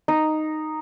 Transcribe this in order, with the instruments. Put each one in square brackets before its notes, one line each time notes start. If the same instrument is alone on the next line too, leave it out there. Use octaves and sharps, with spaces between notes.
[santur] D#4